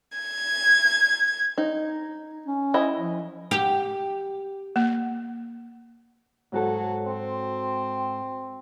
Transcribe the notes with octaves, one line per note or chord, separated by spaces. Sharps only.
G#6
D#4
C#4
E4 D#5 B5
F3
G4
A#3
G#2 F#3 F#4 A4
C4